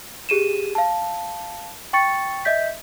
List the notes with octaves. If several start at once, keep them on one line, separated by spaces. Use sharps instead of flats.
G4 G#4 D#7 E7
F5 A5
G5 C#6 A6 C#7
D#5 E5 G6 B6